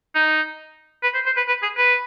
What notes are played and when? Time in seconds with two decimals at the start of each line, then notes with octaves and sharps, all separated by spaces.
0.15 D#4
1.03 B4
1.14 C5
1.26 C5
1.37 B4
1.48 B4
1.63 G#4
1.77 B4